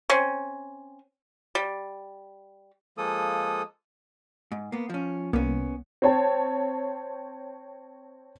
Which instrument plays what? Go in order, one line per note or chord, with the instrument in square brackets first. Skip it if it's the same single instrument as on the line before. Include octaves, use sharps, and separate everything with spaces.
[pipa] C4 C#4
G3
[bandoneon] F3 G#3 A#3 A4 D#6
[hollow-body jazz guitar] G#2
A#3 B3
F3 C#4
[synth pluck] C2 A#3 [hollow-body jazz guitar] B3 C#4
[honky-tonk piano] C4 C#5 A5